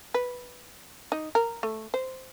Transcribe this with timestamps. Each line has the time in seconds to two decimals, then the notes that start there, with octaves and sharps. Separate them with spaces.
0.14 B4
1.12 D#4
1.35 A#4
1.63 A3
1.94 C5